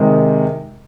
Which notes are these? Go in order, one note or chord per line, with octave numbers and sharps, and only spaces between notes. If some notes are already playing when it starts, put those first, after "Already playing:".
Already playing: C3 D#3 G#3